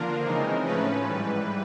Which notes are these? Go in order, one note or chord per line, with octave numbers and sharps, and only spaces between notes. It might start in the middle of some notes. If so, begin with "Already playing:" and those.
Already playing: D3 F3 A#3 D4 F4 A#4
C#3 E3 G#3 C4 D#4
A2 F3 A3 C#4 B4
G#2 E3 G3